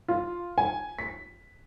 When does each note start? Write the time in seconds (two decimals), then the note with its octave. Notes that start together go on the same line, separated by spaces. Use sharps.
0.08 F4
0.58 G#5
0.99 B6